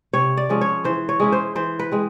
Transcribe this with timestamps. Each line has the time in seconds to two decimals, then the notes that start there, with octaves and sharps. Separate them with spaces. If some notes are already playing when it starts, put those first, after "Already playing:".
0.13 C3 C#5
0.37 D5
0.49 F3 G#3 C#4
0.61 C#5
0.84 E3 C5
1.09 C#5
1.20 G#3 C#4 E4
1.32 C5
1.55 E3 C5
1.79 B4
1.92 G#3 C4